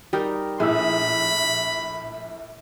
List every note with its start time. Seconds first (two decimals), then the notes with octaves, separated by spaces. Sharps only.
0.13 G3 D#4 A#4
0.60 A#1 A2 G#4 B5 E6